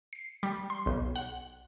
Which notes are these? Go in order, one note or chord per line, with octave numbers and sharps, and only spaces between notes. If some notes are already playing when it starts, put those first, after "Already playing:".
C7
G3
C6
B1
F#5